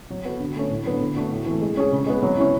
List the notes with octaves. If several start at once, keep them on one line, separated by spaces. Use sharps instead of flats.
F#3
B3 F#4 A4
D3
A3 C#4
A2
F#3 B3 D4
D3
A3 D4 F#4
A2
E3 A3
G#3
C#4 G#4
C#3
G#3 B3
F#3
C#4 E4